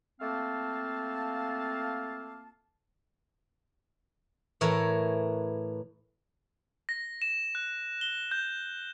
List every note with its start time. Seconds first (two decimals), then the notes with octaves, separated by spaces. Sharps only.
0.21 A3 A#3 C4 F4 F5 A5
4.61 A2 E3 A#4 C#5 A#5
6.89 A#6
7.22 E7
7.55 F#6
8.01 G7
8.31 G6